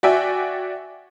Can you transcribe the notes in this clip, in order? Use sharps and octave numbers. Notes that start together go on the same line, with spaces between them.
F#4 D5 E5 G5 G#5